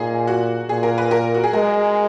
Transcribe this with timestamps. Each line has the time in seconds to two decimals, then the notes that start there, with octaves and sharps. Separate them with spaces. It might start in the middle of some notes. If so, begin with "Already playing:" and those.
Already playing: A#2 D#4 G#4
0.27 F#4
0.69 A#2 G#4
0.83 A#4
0.98 B4
1.11 A#4
1.34 F#4
1.44 G#4
1.53 G#3 A#4